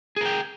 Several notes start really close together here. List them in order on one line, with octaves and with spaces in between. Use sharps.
G#4 A#4 G5